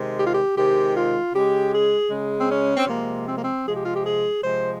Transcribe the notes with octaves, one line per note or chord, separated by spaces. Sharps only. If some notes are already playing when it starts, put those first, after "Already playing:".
Already playing: C3 D#3 G#3
G4
F4
G4
C3 D#3 G#3 G4
F4
C#3 G#3 G4
G#4
C#3 G#3
C4
C#4
C4
C3 F3 G#3 A#3
C4
A#3
C4
C3 F3 G#3 G#4
G4
F4
G4
G#4
C3 F3 G#3 C5